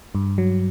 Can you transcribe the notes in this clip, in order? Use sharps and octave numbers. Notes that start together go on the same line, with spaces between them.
G2
F#3